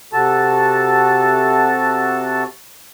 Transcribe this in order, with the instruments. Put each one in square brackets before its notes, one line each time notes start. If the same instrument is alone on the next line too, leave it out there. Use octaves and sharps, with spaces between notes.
[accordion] C3 F#4 A4 A5